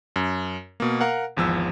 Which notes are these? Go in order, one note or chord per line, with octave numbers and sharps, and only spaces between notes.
F#2
B2 A#3
A#4 F5 F#5
G#1 E2 F3 E6